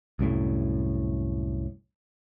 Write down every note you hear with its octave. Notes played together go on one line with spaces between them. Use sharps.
C2 F#2 A2